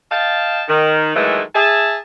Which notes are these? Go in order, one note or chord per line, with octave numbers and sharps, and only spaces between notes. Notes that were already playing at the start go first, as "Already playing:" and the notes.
D#5 F5 G5 A5
D#3
D#3 E3 F#3 G#3 A3
G#4 E5 A5